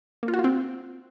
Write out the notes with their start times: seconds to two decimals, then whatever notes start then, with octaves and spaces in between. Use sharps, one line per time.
0.23 A#3
0.28 F4
0.34 F#4
0.39 F4
0.44 C4